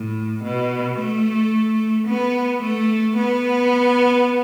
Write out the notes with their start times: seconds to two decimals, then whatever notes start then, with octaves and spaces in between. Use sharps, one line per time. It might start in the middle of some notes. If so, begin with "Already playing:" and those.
Already playing: A2
0.43 B2
0.98 A3
2.07 B3
2.62 A3
3.16 B3